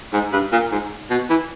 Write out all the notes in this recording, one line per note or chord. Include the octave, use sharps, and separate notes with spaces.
G#2
G2
A#2
G#2
B2
E3